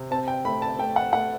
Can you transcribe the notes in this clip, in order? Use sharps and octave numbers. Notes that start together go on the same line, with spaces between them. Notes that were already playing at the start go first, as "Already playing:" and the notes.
Already playing: C3
C4 A5
G5
A3 B5
A5
A3 G5
F#5
A3 F#5